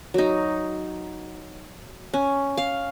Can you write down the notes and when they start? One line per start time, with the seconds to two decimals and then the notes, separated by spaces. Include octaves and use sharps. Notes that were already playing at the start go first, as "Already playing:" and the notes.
0.14 F#3 D#4
2.14 C#4
2.57 F5